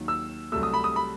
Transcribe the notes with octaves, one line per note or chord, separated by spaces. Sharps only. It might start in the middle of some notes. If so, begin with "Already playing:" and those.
Already playing: D#2 D#3 F#3
E6
C2 C3 F#3 A3 E6
D#6
B5
D#6
B5